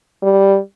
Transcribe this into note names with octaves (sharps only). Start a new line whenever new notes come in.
G3